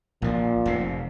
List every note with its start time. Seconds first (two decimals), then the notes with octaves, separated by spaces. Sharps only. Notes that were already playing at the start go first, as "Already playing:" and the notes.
0.22 A#1 A#2 F3
0.66 F1 C3